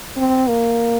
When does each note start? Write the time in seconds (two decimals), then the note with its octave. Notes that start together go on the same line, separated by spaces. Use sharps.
0.17 C4
0.48 A#3